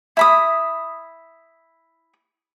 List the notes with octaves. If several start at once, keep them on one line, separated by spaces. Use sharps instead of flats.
E4 B5 D#6